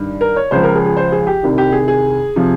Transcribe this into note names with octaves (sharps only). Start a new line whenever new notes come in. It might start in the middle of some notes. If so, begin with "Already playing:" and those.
Already playing: G2 D#3
A#4
C#5
C#2 C#3 F3 C5
A#4
G#4
G#4
C5
G#4
G4
C2 C3 D#3
G4
G#4
G#4
C3 F3